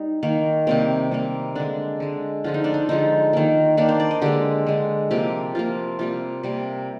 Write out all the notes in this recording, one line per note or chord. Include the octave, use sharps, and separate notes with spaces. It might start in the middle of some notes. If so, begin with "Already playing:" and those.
Already playing: G3 D#4
D#3 A#3
C3 G3 A#3 C4
C3 G3 A#3
D3 G#3 D4
D3 G#3
D3 F3 G#3 F4
D#4
D4
D#4
D3 F3 G#3 D#4
D#3 A#3
D#3 A#3 D4
C5
D5
D#5
D3 G#3 G4
D3 G#3
C3 F3 A#3 G4
C3 F3 A#3 F4
C3 G3 A#3 F4
C3 G3 A#3